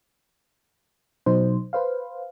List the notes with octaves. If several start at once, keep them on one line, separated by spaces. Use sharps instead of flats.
B2 F#3 D#4 C5
B4 C5 F5